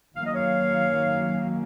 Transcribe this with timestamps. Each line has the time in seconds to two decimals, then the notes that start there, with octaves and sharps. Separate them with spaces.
0.16 D#3 F#3 A#3 C#4 F5
0.25 D#5
0.34 C#5 F5